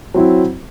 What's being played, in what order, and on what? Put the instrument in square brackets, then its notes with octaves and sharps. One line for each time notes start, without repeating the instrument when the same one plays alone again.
[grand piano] F#3 C4 E4